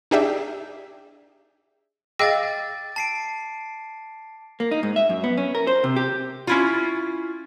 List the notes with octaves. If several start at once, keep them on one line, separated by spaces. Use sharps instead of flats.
D4 D#4 G4 G#4 D5 E5
G#4 D#5 F5 G5 D6 E6 A6 A#6
A5 C7 D7
A#3
D#4
G#2
E5
F#2
B3
C#4
A#4
C5
C3
G4
C#4 E4 F4